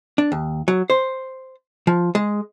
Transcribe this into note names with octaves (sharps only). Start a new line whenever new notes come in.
D4
D#2
F#3
C5
F3
G#3